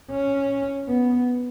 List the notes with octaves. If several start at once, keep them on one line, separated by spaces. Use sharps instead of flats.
C#4
B3